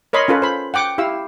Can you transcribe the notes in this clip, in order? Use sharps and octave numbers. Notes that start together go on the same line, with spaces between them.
A#4 C#5 D#5 B5 C6
C#4 F4 A4 B4
C5 B5
F#5 G5 D6
E4 G4 F5 E6